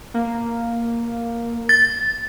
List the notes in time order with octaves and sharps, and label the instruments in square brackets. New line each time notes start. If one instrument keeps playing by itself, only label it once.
[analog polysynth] A#3
[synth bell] A6